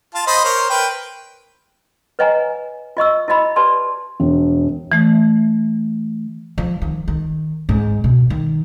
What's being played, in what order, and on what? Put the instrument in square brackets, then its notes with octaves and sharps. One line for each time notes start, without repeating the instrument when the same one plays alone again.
[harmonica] F4 A5
C5 D#5 B5
A#4 C5 C#5
A#4 B4 G5
[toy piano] B4 C#5 D#5 F#5 G#5 A#5
F4 D#5 C#6 E6
E4 F#4 D#5 B5
G4 B4 D5 A5 C6
[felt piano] E1
[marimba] E3 A3
[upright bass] F3
D#3
D#3
G#2
B2
D#3